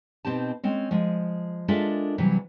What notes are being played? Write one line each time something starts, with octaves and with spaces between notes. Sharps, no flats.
B2 C4 D#4 G4 A5
G#3 C4 C#4
F3 G#3
G#3 D4 F4 A4 A#4 E5
C3 E3 F#3 G3